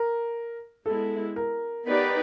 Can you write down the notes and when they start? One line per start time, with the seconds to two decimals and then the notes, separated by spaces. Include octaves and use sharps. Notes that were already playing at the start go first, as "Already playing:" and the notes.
Already playing: A#4
0.86 G#3 B3 E4 A4
1.36 A#4
1.86 B3 D#4 G4 B4 D5